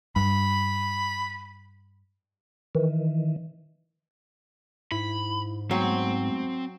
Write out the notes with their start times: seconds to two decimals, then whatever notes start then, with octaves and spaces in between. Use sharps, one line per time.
0.16 G2 B5
2.75 D#3 E3
4.92 G#2 E4 B5
5.71 F#3 G#3 A3 B3 C4